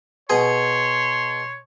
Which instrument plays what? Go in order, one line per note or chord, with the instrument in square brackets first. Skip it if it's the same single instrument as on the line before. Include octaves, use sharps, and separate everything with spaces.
[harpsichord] B2 G#4 [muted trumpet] C#5 [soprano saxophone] C6